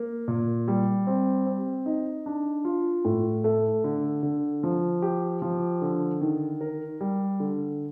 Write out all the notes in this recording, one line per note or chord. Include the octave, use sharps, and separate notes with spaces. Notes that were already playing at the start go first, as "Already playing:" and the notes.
Already playing: A#3
A#2
G3
C4
C4
D#4
D4
F4
A2
A3
D3
D3
F3
G4
F3
D3
D#3
A#4
G3
D3